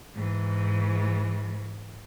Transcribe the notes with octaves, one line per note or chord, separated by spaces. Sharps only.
G#2 E3